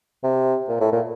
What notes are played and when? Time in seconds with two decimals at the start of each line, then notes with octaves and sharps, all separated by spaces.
0.24 C3
0.69 A#2
0.81 A2
0.92 A#2